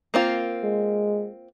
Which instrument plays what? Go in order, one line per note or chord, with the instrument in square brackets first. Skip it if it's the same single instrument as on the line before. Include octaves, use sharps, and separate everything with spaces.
[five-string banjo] A#3 C4 F4
[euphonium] G#3